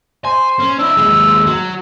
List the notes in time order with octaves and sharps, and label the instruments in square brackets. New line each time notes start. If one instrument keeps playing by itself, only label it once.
[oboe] C5 [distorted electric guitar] G#5
[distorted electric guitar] C#4
[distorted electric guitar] D4 E4 [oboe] E6
[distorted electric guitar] D#2 G#3
F#3